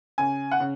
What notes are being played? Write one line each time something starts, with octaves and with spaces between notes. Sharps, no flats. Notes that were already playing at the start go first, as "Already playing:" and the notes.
C#3 G#5
F#5
C#3